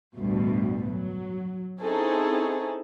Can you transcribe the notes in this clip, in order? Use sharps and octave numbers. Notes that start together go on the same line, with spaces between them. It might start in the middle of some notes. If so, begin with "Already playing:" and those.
A1 D2 G2 B2 G3
F#3
C4 C#4 D#4 E4 G#4 A4